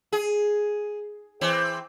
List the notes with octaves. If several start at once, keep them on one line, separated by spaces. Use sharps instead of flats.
G#4
E3 C4